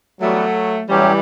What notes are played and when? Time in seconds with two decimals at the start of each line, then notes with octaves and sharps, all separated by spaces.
0.21 E3 F#3 G3 A3 B3
0.89 A2 E3 F#3 G3 C#4 G4